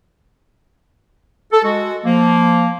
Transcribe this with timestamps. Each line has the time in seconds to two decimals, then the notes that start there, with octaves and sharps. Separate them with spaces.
1.52 A4
1.64 G#3 F#4
2.05 F3 A#3